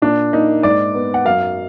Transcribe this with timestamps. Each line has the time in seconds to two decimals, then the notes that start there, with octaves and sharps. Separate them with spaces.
0.02 A#2 D4
0.33 A#3 D#4
0.63 G#2 D5
0.95 B3
1.14 F#5
1.25 F#2 F5